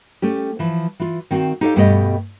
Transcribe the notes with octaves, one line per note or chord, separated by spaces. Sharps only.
A3 C#4 G4
E3 F3
E3 F4
D#3 C4 F#4 F5
D#4 G4 A4 B4 C#5 F5
G2 B2 A3 G4 A4 D#5